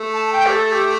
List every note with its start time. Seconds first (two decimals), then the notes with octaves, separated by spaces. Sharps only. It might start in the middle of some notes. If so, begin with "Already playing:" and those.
Already playing: A3
0.13 A5
0.33 G5
0.46 G4
0.52 A4
0.72 G4